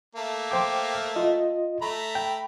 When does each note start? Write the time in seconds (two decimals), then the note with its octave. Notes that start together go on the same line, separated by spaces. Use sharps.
0.16 A3 A#3
0.51 C5 G5 D6
1.16 F4 D#5
1.82 A3 A#5 B5
2.15 G5